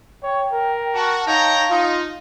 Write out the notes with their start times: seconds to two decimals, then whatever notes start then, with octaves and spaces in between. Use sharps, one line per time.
0.23 C#5 G5
0.53 A#4
0.94 F#4 A5
1.27 D#4 C#5 F5 G5 A#5
1.70 D#4 F4